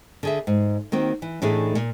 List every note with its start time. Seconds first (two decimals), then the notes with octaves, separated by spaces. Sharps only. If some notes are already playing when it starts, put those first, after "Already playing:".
0.23 D3 G#4 E5
0.47 G#2
0.92 D#3 A#3 C4 F#4
1.22 E3
1.42 A2 E3 A3 D4 D#4 G#4
1.75 A#2